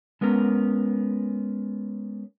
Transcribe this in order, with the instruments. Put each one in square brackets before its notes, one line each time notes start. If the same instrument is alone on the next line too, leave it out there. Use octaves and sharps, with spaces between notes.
[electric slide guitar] G#3 B3 C#4 A#4